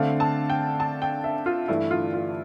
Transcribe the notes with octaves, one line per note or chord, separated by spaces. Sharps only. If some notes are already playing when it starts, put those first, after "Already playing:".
Already playing: D3 A3 C4 F5
A5
G5
A5
G5
E5
F4
G2 E3 A3 E4
F4
F4